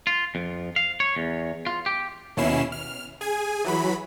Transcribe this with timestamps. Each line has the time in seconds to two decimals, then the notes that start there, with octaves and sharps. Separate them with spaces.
0.07 F4
0.35 F2
0.76 F5
1.00 C#5
1.17 E2
1.67 F4
1.86 G4
2.37 D#2 B2 C#4 E4 C7 E7
2.72 F6
3.21 G#4 G#5
3.64 E3 F#3 B5